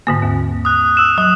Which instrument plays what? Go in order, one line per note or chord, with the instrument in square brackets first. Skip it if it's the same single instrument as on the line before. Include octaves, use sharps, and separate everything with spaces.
[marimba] G#2 D3 A#3
D#2
[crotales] D#6 F#6
E6 E7
[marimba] F#3 [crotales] D#6